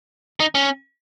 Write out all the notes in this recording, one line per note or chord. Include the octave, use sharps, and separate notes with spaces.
D#4
C#4